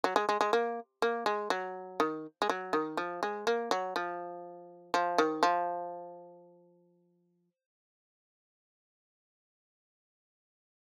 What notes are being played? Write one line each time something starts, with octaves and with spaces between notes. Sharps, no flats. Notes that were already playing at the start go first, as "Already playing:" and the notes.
F#3
G#3
G#3
G#3
A#3
A#3
G#3
F#3
D#3
G#3
F#3
D#3
F3
G#3
A#3
F#3
F3
F3
D#3
F3